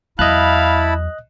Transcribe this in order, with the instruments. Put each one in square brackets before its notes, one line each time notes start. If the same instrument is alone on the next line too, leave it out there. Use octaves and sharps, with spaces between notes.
[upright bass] E2 F#3 [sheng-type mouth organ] E4 A5 B5 [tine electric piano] D#5 F#6 [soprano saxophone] F5